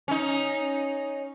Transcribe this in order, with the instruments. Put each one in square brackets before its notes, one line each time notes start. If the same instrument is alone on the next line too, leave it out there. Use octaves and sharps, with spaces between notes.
[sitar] C#4 D#4